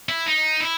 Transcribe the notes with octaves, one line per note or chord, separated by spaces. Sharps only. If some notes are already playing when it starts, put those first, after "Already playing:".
E4
D#4
E4